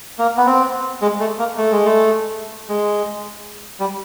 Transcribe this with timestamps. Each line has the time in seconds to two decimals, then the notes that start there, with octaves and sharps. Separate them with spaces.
0.19 A#3
0.37 B3
0.46 C4
1.02 G#3
1.20 A3
1.39 A#3
1.57 A3
1.72 G#3
1.85 A3
2.69 G#3
3.80 G3